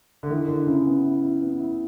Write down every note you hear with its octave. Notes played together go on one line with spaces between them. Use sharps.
D3
D#3 E4
D3 E4
C#3 E4
B3
E4
E4
B3
E4